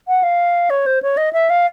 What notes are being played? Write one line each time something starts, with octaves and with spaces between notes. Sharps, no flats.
F#5
F5
C#5
C5
C#5
D#5
E5
F5